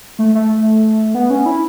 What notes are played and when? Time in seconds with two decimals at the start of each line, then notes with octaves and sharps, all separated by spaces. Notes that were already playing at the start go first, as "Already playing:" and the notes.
0.19 A3
0.35 A3
1.15 B3
1.30 C#4
1.46 E4